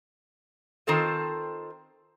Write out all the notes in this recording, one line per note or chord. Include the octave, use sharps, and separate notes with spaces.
D#3 C4 F4 A4 C5